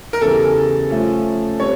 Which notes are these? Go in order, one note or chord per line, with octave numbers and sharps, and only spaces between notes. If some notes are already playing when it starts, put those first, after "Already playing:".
A#4
E2 C#3 E3 G3 A4
F3 A3 C#4 F4
G3 C4 C#5